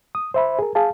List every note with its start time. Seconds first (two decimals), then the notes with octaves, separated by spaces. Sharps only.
0.15 D#6
0.34 C5 E5 B5
0.59 G#4 A#4
0.75 G#4 F5 A5